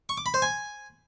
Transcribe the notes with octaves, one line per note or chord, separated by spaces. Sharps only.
C#6
D6
B5
C5
G#5